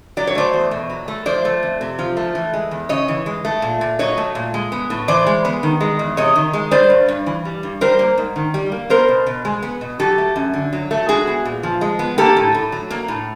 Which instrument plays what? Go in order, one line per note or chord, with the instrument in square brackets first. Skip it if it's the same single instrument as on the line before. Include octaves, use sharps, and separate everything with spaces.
[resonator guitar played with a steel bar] F#3 D5
C#5
A3 C5 D5
E2
B2
F#3
A3
F3 C5 D5
A3
F2
C3
F3
A3
E3
G#3
E2
C#3 C#5 D#5
E3
G#3
A3
A#2
A#2
F#3 C#5 D#5
A3
A#2
G#3
B3
A2
E3 C5 D5
G#3
B3
D#3
G#3
E2
C3 C#5 D#5
D#3
G#3
G3 C5 D5
G2
G2
E3
G3
G2
G3 A#4 C5
A#3
G#2
D#3
G3
A#3
B3 A#4 C5
B2
B2
G#3
B3
B2
F#3 G4 A4
A3
F#2
D3
F#3
A3
G#3 F#4 G#4
B3
A#2
F3
G#3
B3
A#3 G4 A4
A2
A2
F#3
A#3
A2